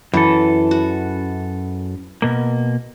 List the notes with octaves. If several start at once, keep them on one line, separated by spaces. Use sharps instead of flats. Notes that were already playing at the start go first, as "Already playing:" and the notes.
F#2 E3 A4
F#4
B2 A#3